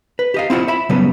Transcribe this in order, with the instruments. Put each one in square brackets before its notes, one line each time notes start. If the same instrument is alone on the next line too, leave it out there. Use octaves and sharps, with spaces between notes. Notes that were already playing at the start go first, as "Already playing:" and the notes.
[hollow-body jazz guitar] B4
G4 D#5 F5
C4 E4 F4 F#5
E5 B5
C#3 F#3 G3 B3 B4